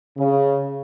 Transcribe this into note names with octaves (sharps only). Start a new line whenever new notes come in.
C#3